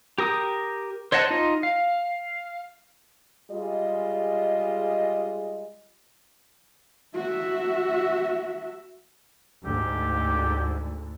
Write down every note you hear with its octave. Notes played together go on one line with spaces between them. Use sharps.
G4 A#4 D#6
C5 C#5 D#5 F#5 A5
D#4 F4 D#5
F5
G3 G#3 F4 G#4 D#5
F#4 E5
D2 G#2 D3 G4